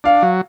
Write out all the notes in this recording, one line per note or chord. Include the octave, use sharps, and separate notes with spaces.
D4 F5
F#3